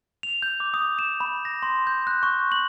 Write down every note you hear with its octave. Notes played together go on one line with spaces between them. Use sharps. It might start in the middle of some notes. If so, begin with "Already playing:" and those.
F7
G6
D6
D#6
E7
B5
A#6
C6
G6
F#6
C#6
F#7